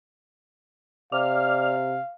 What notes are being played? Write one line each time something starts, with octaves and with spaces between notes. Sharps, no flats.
C3 D5 F5 F6